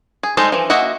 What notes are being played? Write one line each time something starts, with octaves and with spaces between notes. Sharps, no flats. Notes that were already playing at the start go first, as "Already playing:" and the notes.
G#4
G3 G#3 D#4 A4 C5
E3 F3
A#3 F#4 D#5 E5 F#5